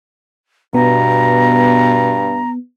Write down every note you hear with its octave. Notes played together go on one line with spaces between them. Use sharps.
G2 B2 B3 A#5